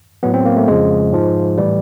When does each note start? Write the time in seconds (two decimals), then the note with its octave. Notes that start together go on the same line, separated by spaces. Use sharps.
0.23 A2 F#3 B3
0.34 C4
0.45 A#3
0.57 A3
0.68 F2 C#3 F3 G#3
1.13 G#2 F3
1.57 A2 E3 G3